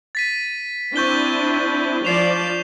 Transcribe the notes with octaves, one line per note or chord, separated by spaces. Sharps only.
A6 B6 D#7
C4 D4 E4 C#6 G6 G7
F3 D5 C7 E7 F7